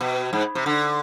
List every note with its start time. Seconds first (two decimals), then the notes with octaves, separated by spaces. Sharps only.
0.01 B2
0.33 G#2
0.55 C3
0.66 D3